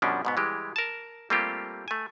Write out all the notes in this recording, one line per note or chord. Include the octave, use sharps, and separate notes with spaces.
F#2 B2 F3 G3 C#4 D4
G#2 B2 B3
E3 G3 G#3 G4
A#4 A5
G3 A3 A#3 C4 F4 G4
A3 G#5